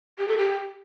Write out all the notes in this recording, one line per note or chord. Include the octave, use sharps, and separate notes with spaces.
G4
A4
G4